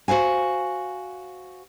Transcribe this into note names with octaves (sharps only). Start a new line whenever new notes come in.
F#4 C5 F5 G#5